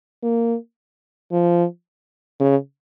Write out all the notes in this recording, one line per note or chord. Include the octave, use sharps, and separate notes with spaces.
A#3
F3
C#3